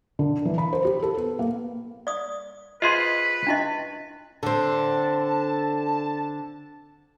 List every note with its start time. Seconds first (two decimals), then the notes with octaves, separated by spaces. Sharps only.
0.19 D3
0.45 E3
0.58 B5
0.73 C5
0.85 G4
1.02 A4
1.17 B3
1.39 A#3
2.07 D5 D#6
2.82 F4 G#4 B4 C5 D#5 C6
3.47 D4 E4 D#5
4.43 D3 C4 A5